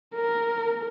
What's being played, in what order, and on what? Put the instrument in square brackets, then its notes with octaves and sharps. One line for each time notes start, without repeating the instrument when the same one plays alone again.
[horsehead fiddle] A#4